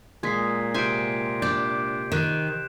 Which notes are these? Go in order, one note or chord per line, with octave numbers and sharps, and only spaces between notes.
A#2 G#3 G#6 B6 C7
C3 C5 G#5 B6 C7 D7
D4 D5 G6
D#3 F#6 E7